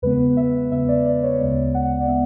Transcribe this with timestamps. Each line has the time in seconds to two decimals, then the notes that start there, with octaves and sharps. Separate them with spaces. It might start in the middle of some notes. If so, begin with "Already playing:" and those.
0.02 E2 C#3 G#3 B3 B4
0.37 E5
0.71 E2 C#3 G#3 B3 E5
0.88 D5
1.06 D5
1.23 C#5
1.39 D2 C#3 G#3 B3 D5
1.74 F#5
2.00 D5
2.08 G#3 B3 E5